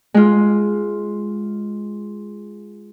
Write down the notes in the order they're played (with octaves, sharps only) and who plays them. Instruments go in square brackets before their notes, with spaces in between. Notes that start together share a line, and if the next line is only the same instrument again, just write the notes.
[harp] G#3 F4